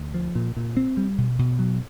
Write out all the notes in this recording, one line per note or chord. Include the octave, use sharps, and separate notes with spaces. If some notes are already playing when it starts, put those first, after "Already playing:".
Already playing: D2
F3
A#2
A#2
C4
G3
B2
B2
F#3